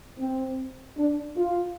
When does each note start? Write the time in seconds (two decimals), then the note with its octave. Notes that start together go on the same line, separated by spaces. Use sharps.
0.19 C4
0.97 D4
1.37 F4